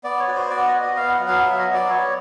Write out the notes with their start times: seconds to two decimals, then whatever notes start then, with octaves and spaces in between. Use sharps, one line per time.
0.04 B3 D5
0.20 C#5
0.27 F#4
0.35 C5
0.50 B3 D5
0.66 D#5
0.73 B3
0.81 D#5
0.97 B3 F5
1.12 F#5
1.19 F#3
1.28 F5
1.43 F#3 E5
1.59 D#5
1.66 B3
1.74 D5
1.89 B3 C#5